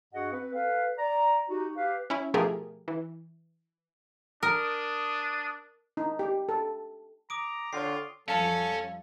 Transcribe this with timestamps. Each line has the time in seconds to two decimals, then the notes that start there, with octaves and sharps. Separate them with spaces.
0.13 G2 F#4 G#4 D#5 F#5
0.32 C4 B4
0.53 A4 B4 F5
0.97 D5 A#5
1.49 D#4 F#4 G4
1.76 G4 B4 F5
2.10 C#4 E4
2.34 B2 F3 A3 G4 G#4 A#4
2.88 E3
4.43 D4 A#4 D#6
5.97 D#4
6.19 G4
6.49 A4
7.30 A#5 D6 D#6 D7
7.73 D3 F4 G4 C#5 C7
8.28 F2 F3 G3 C#4 A4 F5 A5 B5